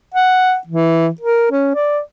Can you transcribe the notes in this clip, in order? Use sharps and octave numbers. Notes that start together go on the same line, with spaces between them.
F#5
E3
A#4
C#4
D5